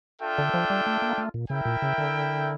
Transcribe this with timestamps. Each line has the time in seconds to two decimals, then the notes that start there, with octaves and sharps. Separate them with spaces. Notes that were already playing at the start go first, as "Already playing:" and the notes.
0.22 D4 F4 A4 E5 G5
0.38 D3
0.54 F3
0.70 G3
0.86 A3
1.02 A#3
1.18 A3
1.34 A#2
1.50 C#3 E4 A#4 E5 G5
1.65 A#2
1.82 C#3
1.98 D3